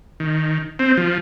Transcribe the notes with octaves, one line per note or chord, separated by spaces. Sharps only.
D#3
C4
F3